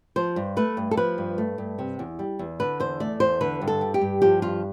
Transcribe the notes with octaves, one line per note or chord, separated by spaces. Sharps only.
F3 C5
G2
A3 B4
G2
A4
F3 B4
G2
A3
G2
C3
E2
G3
E2
D3 B4
E2 C5
A3 D5
E2 C5
D3 B4
G2
A4
G3
G4
G2
F3 G4
G2 F4